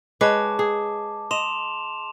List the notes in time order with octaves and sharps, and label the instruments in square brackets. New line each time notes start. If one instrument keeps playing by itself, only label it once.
[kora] G#3 B4 C#5 [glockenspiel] A5 D6
[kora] G#4
[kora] D#5 [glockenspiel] C6 E7 F7